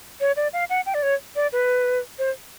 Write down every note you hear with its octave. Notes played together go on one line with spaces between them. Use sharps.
C#5
D5
F5
F#5
G5
D5
C#5
D5
B4
C5